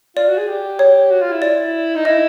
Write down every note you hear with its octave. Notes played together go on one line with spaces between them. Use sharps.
F4 D5
F#4
G#4
G4
C#5
F#4
F4
E4
D5
D#4
E4 D#5